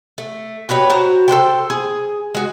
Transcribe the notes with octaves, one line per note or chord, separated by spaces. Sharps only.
A3
F#4 G4 B4 C#5
F#4 C5 A5 A#5
A4 B4 C5 G5
G#4
G#3 F#4